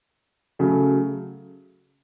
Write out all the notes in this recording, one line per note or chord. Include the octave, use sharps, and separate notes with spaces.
C#3 F#3 A3